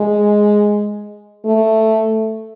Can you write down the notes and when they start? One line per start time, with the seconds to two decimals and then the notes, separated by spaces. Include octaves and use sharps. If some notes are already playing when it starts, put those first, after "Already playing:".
Already playing: G#3
1.45 A3